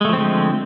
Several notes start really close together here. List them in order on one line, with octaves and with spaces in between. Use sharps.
G#3 A3 F3 C4 D3